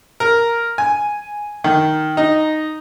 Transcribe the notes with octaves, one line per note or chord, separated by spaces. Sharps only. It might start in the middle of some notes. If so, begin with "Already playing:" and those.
A#4
G#5
D#3
D#4